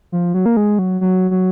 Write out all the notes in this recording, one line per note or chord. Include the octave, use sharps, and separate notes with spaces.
F3
F#3
A#3
G#3
F#3
F#3
F#3